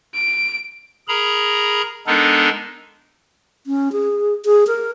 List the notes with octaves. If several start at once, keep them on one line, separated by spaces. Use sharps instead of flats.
D7
G#4 A#4 A#5 B5
G#3 B3 D4 D#4 A4 A#4
C#4
G#4
G#4
A#4